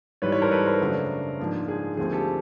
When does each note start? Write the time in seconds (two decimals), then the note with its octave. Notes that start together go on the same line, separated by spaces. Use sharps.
0.22 G#2 E3 G3 B4 C#5
0.32 B4 C#5
0.42 A#4 C5
0.51 A4 B4
0.66 A#4 C5
0.81 F#2 C#3 F#3 A3 D4
1.39 G#2 F3 A#3 D4
1.68 G#4
1.97 D#2 D3 F3 A3 C4 G#4
2.12 G4 A4